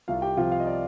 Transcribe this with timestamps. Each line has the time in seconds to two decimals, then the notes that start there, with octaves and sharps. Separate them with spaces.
0.08 C2 F4 F5
0.22 G4 G5
0.37 C3 F3 F4 F5
0.52 F5
0.60 D#5
0.67 D5